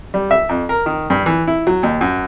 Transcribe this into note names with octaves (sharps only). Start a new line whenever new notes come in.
G3
E5
F2
A#4
D#3
G2
E3
E4
F#3
D#2
F#2